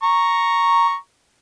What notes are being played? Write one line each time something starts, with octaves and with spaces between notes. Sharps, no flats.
A#5 C#6